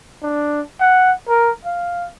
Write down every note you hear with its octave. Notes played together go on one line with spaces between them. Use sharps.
D4
F#5
A#4
F5